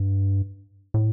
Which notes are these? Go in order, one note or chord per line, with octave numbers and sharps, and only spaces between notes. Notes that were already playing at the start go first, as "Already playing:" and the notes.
Already playing: G2
A2